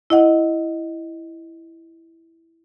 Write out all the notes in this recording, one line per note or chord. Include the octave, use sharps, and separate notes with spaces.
E4 D#5 F#5